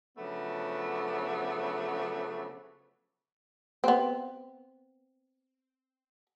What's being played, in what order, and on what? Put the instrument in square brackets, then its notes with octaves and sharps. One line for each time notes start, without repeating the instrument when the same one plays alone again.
[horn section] C#3 F3 F#3 A3 B3 D4
[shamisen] B3 C4